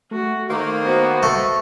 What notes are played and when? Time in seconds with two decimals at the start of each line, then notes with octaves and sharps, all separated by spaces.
0.11 A3 F#4
0.50 D#3 A3 A#3 C5
0.79 B3 F#4 C5
1.23 A3